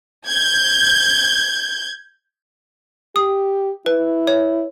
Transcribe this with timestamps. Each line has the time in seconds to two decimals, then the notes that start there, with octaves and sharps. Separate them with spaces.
0.26 G6 G#6
3.16 G4 D#6
3.86 E4 B4
4.27 C#5